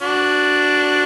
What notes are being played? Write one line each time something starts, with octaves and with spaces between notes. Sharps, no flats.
D4 F#4